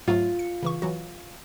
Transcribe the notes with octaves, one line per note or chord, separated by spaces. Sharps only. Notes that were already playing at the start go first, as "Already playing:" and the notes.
G#2 F#3 A3 F4
C#7
C#3 E3 C#6
E3 F#3 F#4